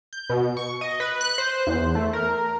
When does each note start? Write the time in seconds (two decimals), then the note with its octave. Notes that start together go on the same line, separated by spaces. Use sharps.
0.13 G6
0.30 B2
0.57 C#6
0.81 D#5
1.00 B4
1.21 F#6
1.38 C5
1.67 E2
1.95 A3
2.13 A#4